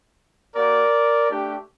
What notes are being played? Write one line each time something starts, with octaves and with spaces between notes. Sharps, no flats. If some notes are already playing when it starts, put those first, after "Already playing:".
A#3 F#4 A#4 D5
A3 D4 G4